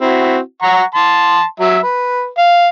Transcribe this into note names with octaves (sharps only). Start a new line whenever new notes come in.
C4 E4 F#4
F#5 A#5 C#6
A5 C6
F#3 E5
B4
F5